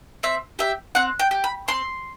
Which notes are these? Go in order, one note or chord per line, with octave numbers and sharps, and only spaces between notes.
C4 E5
G4 E5
C4 F#5
G5
G4
B5
C4 C6